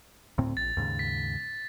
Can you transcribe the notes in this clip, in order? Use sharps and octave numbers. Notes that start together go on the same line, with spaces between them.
D2 A2 C4
A#1 A6
D#2 G#2 C#3
B6